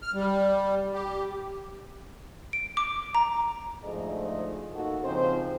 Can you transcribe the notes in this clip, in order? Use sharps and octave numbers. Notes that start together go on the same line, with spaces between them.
F6
G3
G4
D7
D6
A#5
D2 G#2 F3 A3 G#4 D#5
A#3 D#4 F#4 A4
C#3 F3 C4 D#4 C5